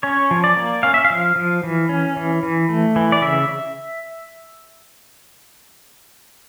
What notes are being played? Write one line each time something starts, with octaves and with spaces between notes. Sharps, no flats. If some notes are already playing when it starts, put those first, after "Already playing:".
C#4 C#5
F3
D5
A#3
C#4 F5
E5
F5
F3
F3
E3
C#4
E3
E3
A3
E3
D5
C#3 E5